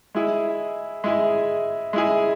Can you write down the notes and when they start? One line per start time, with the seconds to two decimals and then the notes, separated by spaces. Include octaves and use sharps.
0.15 G#3 E4 G#4
1.04 G#3 E4 G#4
1.93 G#3 E4 G#4